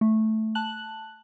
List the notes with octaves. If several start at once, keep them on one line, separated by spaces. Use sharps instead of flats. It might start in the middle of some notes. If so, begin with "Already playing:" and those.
A3
A5 F#6 F#7